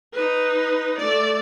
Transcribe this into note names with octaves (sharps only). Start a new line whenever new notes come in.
D#4 B4
A3 D5